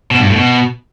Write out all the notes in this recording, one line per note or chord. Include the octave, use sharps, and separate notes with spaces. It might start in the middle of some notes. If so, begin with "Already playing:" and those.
B2
G2
A2
B2